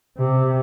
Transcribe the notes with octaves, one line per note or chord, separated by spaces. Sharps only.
C3